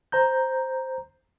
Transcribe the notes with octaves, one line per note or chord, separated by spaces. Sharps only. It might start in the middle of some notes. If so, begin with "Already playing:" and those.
C5 A#5 G6